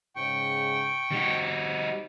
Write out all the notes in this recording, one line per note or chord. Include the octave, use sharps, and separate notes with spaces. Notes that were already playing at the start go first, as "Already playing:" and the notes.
G#2 C#3 G5 C#6
G3 C4 D#4 F#4